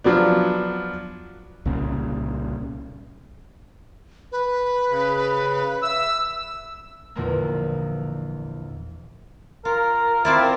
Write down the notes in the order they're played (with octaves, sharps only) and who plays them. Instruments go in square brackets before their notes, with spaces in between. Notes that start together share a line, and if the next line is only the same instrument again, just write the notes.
[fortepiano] F3 F#3 B3 D4
[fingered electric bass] C2 A#2 C#3
[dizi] B4
[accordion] C#3
[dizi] E5 [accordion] E6
[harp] A#1 E2 A#2 D3 G#3 A#3
[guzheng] F4 [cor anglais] A#4
[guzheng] C4 F4 D5 [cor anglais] E4
[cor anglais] A#4